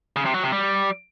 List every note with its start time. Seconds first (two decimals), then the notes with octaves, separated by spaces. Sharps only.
0.16 C#3
0.25 C3
0.34 F#3
0.43 C3
0.52 G3